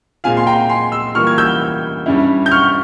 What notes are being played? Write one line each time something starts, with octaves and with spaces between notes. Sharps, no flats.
A#2 G#3 C4 F4 F5 G#5
C6
G5 A#5
G#5 C6
C6 E6
E3 G3 A#3 F4 C#6 F6
G#6
E6 G6
G2 G3 C#4 E4
G6
C#6 F6